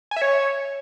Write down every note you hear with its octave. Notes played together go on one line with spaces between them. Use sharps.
G#5
E5
C#5